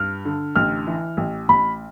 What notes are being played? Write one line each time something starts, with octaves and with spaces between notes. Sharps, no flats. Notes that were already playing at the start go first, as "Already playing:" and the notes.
Already playing: G2 F6
D3
A1 F6
E3
A1
A1 B5